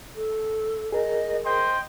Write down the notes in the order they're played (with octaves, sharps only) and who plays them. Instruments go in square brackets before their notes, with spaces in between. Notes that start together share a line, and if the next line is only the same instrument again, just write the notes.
[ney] A4
[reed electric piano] G#4 A#4 [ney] D#5
[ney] C5 [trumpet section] D#5 G5 C6